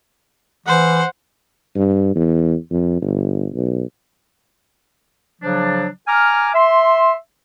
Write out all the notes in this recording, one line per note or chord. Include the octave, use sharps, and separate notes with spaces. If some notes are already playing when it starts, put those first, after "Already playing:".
E3 C5 F#5
G2
E2
F2
G1
B1
C#3 F3 F#3 D4
G#5 A#5 D6 F6
E5 C6